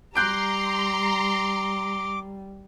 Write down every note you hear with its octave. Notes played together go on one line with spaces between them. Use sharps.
G3 A#5 C6 D6 F#6 G6 D7